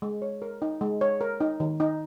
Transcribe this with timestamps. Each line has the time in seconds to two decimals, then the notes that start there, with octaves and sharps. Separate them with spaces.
0.02 G#3
0.22 C#5
0.42 A#4
0.62 D#4
0.81 G#3
1.01 C#5
1.21 A#4
1.41 D#4
1.60 D#3
1.80 D#4